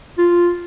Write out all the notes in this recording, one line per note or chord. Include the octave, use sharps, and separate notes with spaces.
F4